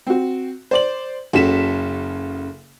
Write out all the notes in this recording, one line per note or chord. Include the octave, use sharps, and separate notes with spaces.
C4 F#4
C5 D5 F#7
F#1 C#3 F#4 A4 B6 E7